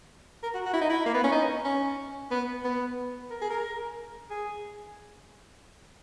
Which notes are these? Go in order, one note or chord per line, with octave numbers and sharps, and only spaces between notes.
A#4
F#4
F#4
E4
D#4
E4
A#3
B3
C#4
D#4
C#4
B3
B3
A#4
G#4
A#4
G#4